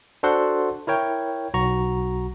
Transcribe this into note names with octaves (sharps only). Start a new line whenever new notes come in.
D4 F#4 A4 C5 F#5 C6
E4 A#4 C#5 G5
B1 F#4 A#5 C#6